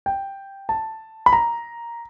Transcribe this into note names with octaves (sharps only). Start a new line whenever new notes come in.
G5
A5
B5
A#5